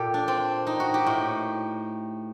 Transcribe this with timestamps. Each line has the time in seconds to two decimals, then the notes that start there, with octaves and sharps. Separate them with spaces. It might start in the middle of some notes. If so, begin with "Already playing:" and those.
Already playing: A#2 G4 A4
0.14 D4
0.28 C4
0.67 D#4
0.80 F#4
0.94 G4
1.06 A2